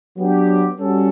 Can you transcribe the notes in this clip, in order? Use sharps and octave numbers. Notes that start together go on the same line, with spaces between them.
F#3 B3 D4 G4
G3 C#4 F#4 A4